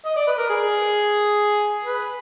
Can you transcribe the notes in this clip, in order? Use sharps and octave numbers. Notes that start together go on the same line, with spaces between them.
D#5
D5
B4
A#4
G#4
B4